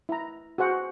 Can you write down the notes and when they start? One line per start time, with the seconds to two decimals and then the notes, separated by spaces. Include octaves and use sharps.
0.09 E4 A#5
0.58 F#4 G#4 C5 F#5